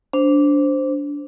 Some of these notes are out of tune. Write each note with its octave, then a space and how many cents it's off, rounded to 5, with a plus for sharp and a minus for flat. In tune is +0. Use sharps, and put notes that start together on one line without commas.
D4 -15 C5 +0